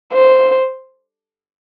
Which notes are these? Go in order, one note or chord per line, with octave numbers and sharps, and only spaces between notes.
C5